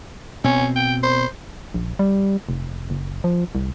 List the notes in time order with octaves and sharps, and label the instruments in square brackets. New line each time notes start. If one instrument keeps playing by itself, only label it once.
[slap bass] B2 C4 [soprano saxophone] C#4
[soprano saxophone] G5
C5
[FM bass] A#1
G3
F1
F#1
F3
C2